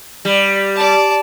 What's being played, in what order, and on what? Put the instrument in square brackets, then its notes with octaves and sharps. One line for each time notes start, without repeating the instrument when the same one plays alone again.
[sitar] G3
[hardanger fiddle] D5 A5